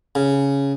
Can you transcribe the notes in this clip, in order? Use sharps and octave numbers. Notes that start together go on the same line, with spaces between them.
C#3